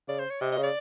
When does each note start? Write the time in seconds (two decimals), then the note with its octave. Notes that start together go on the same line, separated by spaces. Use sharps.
0.08 C#3 D5
0.19 C5
0.30 C#5
0.41 C3 D#5
0.52 D#5
0.58 C#3
0.63 D5